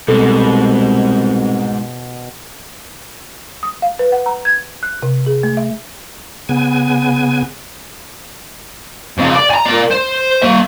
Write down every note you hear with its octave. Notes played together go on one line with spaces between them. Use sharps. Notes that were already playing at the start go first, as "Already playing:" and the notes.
C2 G#2 B2 A4
D#6
F5
B4
F#5
A#5
G#6
F#6
C3
G#4
A3
E5
C#3 B3 G#5
F2 C#3
D5
G#5 A#5
A#4 D5
C5
A#3 E5